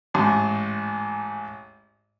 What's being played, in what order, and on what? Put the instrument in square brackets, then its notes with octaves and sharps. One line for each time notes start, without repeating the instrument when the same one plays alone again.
[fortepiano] A1 G#2